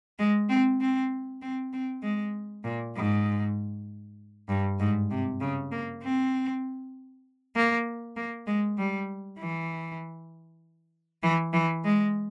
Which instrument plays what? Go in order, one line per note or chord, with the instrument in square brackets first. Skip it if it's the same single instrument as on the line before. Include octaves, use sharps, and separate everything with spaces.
[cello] G#3
C4
C4
C4
C4
G#3
A#2
G#2
G2
G#2
C3
C#3
A#3
C4
A#3
A#3
G#3
G3
E3
E3
E3
G#3